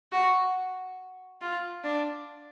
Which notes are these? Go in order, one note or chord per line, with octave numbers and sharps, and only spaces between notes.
F#4
F4
D4